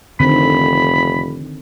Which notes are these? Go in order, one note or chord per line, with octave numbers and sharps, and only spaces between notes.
F1 D3 D#3 C4 B5